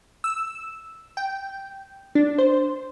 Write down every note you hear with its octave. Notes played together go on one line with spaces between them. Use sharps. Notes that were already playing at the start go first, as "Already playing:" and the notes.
E6
G5
D4
C5